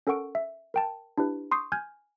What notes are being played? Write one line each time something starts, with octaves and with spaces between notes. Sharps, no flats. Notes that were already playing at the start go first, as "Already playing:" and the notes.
C#4 A4 A#4 F#5 C#6 D7
E5
A#4 G5 A5
D4 E4 G4 B4
C6 C#6 D#6 G6 C7
G#5 F6 G6 G#6